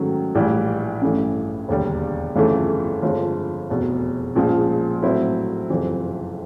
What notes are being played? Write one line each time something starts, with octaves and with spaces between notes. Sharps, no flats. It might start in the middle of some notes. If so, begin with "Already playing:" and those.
Already playing: G#2 D#3 F#3 A3 C#4
A#1 A2 E3 G3
A1 G2 E3 A3 C#4
E1 D#2 D3 G3
G1 F2 C#3 E3 A3
G1 F2 D3 F3 G#3
F1 E2 B2
A#1 A#2 F3 G#3 C#4
A2 F#3 A3 C4 E4
F#1 F2 C3 E3